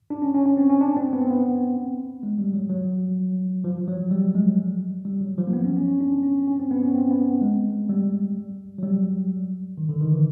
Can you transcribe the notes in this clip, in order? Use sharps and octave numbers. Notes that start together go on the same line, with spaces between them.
D4
C#4
C#4
C#4
C4
C#4
D4
C4
B3
C4
B3
G#3
G3
F#3
F#3
F3
F#3
G3
G#3
G3
F#3
F3
A#3
B3
C#4
C#4
C#4
D4
C#4
C#4
C4
B3
C#4
C4
B3
G#3
G3
F#3
G3
D#3
D3
D#3
E3